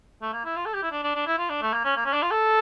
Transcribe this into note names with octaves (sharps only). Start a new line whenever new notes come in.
A3
A#3
E4
F4
A4
G4
E4
D4
D4
D4
E4
F4
D4
A3
A#3
C#4
A#3
C#4
D4
F4
A4